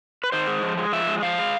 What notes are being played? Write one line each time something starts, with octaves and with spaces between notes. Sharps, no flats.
B4
D#3 C5
G#3
F3
G#3
F3 E5
G#3
F3 F5
G#3